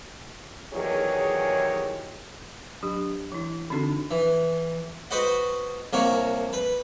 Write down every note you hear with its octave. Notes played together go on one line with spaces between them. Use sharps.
E2 D#3 F#3 G4 G#4 C#5
F#3 D4 G4
E3 E4
D3 C4 D4 D#4 F#4 A4
E3
F#4 B4 C5 D#5 F#5
C2 A#3 A#4 C#5 F#5
B4